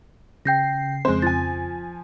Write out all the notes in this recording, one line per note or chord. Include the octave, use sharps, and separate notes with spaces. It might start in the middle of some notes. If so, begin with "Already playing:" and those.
C#3 G5 G6 A#6 C7
F2 C#3 G#3 C4 C5
F3 G#5 A6